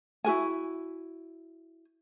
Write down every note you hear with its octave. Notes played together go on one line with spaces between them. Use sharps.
E4 F#4 A#4 G#5